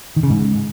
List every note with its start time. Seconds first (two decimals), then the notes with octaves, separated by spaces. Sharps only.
0.16 D#3
0.23 C#3
0.30 G#2